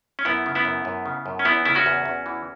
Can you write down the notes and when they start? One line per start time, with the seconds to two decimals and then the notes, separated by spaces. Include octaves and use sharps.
0.19 C#4
0.25 F#2 B3 E4
0.46 C#3
0.55 B3 E4
0.65 F#2
0.85 F#2
1.06 C#3
1.26 F#2
1.39 C#4
1.45 E2 B3 E4
1.65 C#3 E4
1.75 C#4 F#4
1.86 E2
2.05 E2
2.26 E3